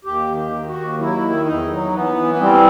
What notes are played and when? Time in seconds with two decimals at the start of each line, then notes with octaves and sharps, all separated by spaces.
0.05 D#2 G4
0.28 D#3
0.37 G4
0.51 D#3
0.68 F#4
0.76 D#2
0.99 F#3 E4
1.22 D#3
1.45 E2 D#4
1.69 F#3
1.92 E3 B3
2.15 E3
2.34 B3
2.39 G3 C4